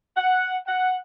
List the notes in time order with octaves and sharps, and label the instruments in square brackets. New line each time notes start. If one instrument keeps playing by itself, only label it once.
[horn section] F#5
F#5